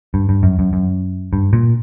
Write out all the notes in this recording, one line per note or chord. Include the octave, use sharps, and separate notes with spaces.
G2
G2
F#2
F#2
F#2
G2
A#2